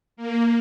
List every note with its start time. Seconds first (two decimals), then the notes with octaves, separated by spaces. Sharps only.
0.17 A#3